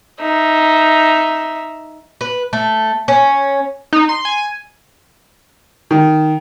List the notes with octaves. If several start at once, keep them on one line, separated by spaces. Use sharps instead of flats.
D#4 E5
B4
A3
C#4
D#4
C6
G#5
D#3